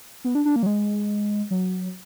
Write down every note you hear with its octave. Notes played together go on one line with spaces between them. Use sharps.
B3
D4
D4
A#3
F#3
G#3
F#3